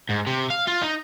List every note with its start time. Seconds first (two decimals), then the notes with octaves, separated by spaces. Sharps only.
0.09 G#2
0.27 C3
0.50 F5
0.68 F4
0.82 D#4